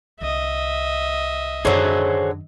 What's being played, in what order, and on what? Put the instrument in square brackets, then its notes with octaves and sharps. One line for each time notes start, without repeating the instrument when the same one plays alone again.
[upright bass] C2 D3 [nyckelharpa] D#5 E5
[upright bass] F#2 D#3 [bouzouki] D3 F#3 [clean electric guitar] G#4 C5 C#5